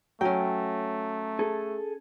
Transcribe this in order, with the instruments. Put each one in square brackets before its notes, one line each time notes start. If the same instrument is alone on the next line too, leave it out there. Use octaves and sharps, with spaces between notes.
[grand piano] F#3 [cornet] A3 [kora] C#4 G5
[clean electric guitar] G#4 A4